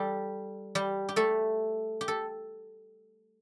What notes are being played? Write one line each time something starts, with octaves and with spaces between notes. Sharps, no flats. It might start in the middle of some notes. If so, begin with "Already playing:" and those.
Already playing: G3 G4 A4
G3 G4
G4
A3 A4
G4
A4